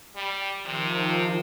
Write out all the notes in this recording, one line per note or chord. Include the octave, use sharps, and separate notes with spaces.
G3
C3 D#3 F3